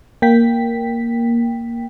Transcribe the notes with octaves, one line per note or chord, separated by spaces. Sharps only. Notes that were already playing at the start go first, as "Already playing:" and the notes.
A#3 G5 B6